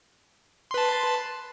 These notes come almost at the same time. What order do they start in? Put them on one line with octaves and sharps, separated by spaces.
C6 B4 A5